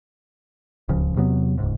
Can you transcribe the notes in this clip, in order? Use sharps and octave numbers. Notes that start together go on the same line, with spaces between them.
D1 C#2 C#3 F3
E2 C3 F#3 B3
D#1 C#2 G#2